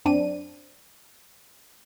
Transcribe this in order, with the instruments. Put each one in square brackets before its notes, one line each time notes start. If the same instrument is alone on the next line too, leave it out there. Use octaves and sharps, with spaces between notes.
[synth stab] F#2 C4 D4 D#7